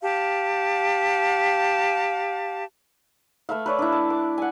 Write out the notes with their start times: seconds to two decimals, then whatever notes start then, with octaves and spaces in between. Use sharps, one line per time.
0.03 G4 F5 A5
3.49 A3 B4 E5 F5
3.66 B4 C#5 D5
3.79 D4 E4
3.92 A5
4.10 D6
4.38 F#5 G#5